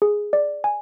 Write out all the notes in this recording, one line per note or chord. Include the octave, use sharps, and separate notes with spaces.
G#4
D5
G#5